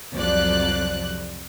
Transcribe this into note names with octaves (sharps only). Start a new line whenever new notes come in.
C2 F2 F3 F#3 D5 F#6